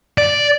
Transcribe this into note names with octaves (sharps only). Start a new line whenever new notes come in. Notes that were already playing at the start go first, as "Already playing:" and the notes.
D5